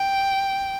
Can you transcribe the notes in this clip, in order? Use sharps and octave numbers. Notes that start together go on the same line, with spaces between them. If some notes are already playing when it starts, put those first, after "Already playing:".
Already playing: G5